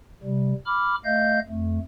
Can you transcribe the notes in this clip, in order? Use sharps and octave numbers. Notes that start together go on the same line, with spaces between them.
C3 G3
B5 D6 F6
A3 D#5 F5 G6
F2 A3